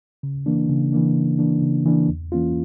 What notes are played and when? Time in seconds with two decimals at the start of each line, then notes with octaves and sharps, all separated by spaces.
0.23 C#3
0.46 E3 A#3 D4
0.69 C#3
0.92 E3 A#3 D4
1.16 C#3
1.39 E3 A#3 D4
1.62 C#3
1.86 E3 A#3 D4
2.09 E2
2.32 E3 A#3 C#4 F4